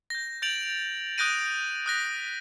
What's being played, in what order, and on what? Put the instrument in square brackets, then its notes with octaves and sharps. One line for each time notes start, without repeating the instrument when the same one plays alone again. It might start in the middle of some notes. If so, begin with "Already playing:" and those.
[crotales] G6 A#6
G6 A6 D7 F7 F#7
D#6 F#6 G6 A#6 D7 D#7
D#6 F#6 A#6 B6